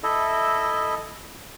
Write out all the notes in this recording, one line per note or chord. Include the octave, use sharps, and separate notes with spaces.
E4 A4 D#5 E5